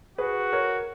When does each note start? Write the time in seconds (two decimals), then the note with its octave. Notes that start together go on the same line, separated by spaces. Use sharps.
0.18 F#4 G#4 B4
0.53 A#4 C#5